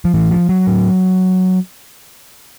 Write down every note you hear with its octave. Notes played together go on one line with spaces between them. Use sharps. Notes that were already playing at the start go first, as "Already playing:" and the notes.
F3
A2 E3
F3
F#3
A2